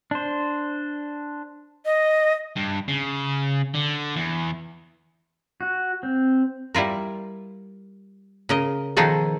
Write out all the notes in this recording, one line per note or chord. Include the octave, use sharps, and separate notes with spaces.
D4 C5
D#5
G2
C#3
D3
E2
F#4
C4
G3 E4 F4 A#4
C#3 A#4 D#5
B2 D#3 F3 D#4 G#4 A4